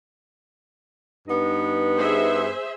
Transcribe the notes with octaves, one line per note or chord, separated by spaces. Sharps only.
G2 B3 D#4
G#4 C5 E5